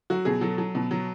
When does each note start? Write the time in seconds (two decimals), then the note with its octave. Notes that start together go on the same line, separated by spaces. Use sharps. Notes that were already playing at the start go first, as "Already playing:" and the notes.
0.10 F#3 F#4
0.25 B2 G#4
0.41 F#3 A4
0.58 F#3
0.75 B2
0.91 F#3